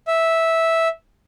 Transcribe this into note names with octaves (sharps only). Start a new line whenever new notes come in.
E5